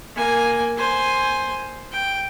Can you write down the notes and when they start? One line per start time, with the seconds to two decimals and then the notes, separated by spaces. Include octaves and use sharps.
0.16 A#3 G#5
0.77 C5 G#5
1.92 G5